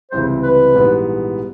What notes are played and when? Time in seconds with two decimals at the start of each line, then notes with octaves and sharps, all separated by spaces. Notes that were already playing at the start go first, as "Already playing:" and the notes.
0.11 C#2 C3 E3 G3 C4 C5
0.43 B4
0.74 A#1 G#2 E3 G3 B3